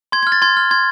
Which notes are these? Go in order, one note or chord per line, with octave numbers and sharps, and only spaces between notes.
C6 G#6
F6 G#6
A6
C6 G#6
F6
C6 G#6